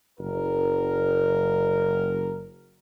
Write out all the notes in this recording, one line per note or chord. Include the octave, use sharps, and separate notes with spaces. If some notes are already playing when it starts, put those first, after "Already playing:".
F#1 A#4